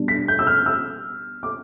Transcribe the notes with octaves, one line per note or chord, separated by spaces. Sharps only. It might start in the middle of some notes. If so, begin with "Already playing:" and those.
Already playing: B2 G3 D4
B6
G6
E6
F6
E6
D6